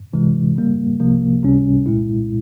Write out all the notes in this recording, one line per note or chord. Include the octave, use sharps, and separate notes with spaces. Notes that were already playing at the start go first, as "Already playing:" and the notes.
C2 C3 E3 G#3
C#3 G3 A#3
C2 C3 F3 A#3
C#2 C3 G3 C#4
C2 A#2 G#3 E4